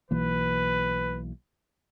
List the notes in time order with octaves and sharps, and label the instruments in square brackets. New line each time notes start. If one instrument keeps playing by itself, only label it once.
[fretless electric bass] B1 E3 A#3 [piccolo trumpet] B4